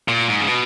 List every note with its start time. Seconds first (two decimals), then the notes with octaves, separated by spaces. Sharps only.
0.08 A#2
0.29 G#2
0.41 C#3
0.48 B2